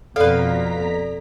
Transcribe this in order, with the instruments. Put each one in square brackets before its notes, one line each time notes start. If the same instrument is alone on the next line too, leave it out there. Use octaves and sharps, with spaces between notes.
[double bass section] F2 [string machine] B2 A#5 B6 [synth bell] A4 D5 [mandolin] B4 F5